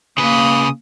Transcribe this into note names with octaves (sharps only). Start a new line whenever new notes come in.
C#3 A#3 B4 D#6